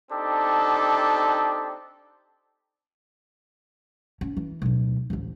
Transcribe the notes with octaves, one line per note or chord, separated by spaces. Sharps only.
C4 D4 D#4 G4 A4
C#4
E3
D1 B1
A1 D2